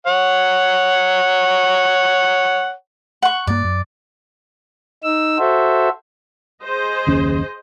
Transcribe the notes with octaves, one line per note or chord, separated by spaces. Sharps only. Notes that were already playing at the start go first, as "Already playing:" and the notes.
C#5 F#5
F#5 C#6
G2 A#3 D5
F#2
D#4 E6
F#4 A4 C5 E5
G#4 C5 D#5
F#1 D#2 C#4